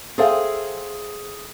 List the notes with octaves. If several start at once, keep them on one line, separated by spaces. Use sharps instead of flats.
G#4 A4 C5 E5 F5 G5